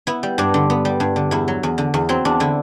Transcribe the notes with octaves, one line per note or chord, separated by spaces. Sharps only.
B3 E4
G3
G2 D4
D3
B3
G3
G2
D3
E2 E4
F#3
E2
D3
E2
F#3 C4
E2 D4
D3 E4